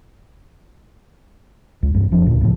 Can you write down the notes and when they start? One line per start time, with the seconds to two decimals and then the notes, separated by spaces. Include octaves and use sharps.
1.83 C#2
1.94 C2 G2
2.12 F1 F3 D4
2.26 D2 A#2
2.41 C#2 A2 C#3 F3